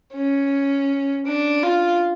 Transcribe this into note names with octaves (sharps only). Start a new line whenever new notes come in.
C#4
D4
F4